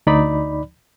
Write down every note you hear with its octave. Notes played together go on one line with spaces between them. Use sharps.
D2 D#4 D5 B5